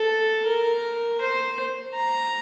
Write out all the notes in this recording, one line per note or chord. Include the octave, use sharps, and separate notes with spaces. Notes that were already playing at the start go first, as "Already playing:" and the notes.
Already playing: A4
A#4
C5
A#5